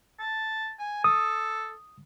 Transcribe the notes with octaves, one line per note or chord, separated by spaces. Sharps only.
A5
G#5
A4 D#6